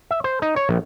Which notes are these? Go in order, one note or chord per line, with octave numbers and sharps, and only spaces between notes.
E5
C5
D#4
C#5
A#1